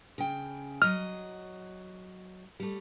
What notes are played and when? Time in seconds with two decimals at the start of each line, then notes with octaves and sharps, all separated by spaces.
0.18 C#3 G5
0.82 F#3 D#5 F6
2.60 G3 A3